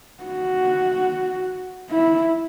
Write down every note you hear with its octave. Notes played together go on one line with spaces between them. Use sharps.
F#4
E4